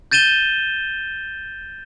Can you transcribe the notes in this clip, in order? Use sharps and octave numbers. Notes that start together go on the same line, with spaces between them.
G6 A6 D#7 E7 G7